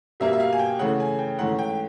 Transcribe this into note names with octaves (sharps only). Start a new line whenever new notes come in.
B2 G3 A#3 E5
E5
F5
G#5
G5
C#3 E3 A3 F#5
G#5
G5
G#2 E3 A3 C#4 F#5
G5